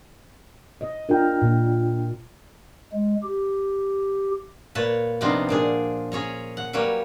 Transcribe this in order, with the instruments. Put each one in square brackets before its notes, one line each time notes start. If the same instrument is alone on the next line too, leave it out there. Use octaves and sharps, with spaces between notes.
[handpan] D#5
[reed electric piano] D4 F4 G5 [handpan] A#4
[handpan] A#2
[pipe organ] G#3
G4
[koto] A#2 B4 C#5 A5
C3 F3 B3 D4 D#4 F4
A#2 D4 G#4
C#4 G#4 C#5 A#5
F#5
F#3 G3 A#3 B4 C#5